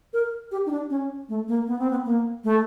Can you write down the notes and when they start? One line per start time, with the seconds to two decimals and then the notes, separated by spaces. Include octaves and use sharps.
0.13 A#4
0.51 G4
0.66 D#4
0.71 D4
0.90 C#4
1.29 A3
1.48 A#3
1.67 B3
1.79 C4
1.91 B3
2.05 A#3
2.44 A3